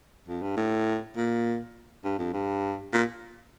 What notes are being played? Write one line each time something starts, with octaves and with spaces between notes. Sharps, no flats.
F2
G2
A2
A#2
G2
F2
G2
A#2